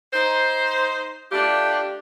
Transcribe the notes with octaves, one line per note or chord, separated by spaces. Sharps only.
D#4 C5
A3 D4 F4 G4